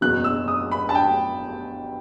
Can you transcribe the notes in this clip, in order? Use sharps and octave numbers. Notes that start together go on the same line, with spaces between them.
F#1 E2 B2 F#3 F#6
E6
D#6
B5
A5
G5